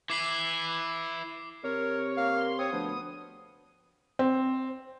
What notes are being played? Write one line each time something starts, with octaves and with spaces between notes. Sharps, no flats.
E3 E4 D6 C7
C3 A#4 C#5
A#3 F5
C6
C4 C#5 D#6
D2 F3 B3
C4